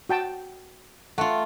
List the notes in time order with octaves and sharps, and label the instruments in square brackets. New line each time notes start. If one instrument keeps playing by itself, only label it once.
[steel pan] F#4 G5 A5
[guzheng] A3 F4 [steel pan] F#5